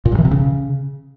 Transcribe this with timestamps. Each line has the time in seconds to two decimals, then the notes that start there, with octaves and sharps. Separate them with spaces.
0.05 A#2
0.12 G2
0.18 E3
0.25 C3
0.31 C#3